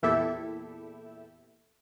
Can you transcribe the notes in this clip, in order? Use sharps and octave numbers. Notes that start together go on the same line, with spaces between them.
E2 A#2 E4 G4 A4 E5